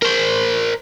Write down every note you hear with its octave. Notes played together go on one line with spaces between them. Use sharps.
A#4 C5